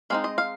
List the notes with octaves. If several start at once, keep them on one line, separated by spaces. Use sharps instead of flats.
G#3 C4 D#4 F5
D#5
F5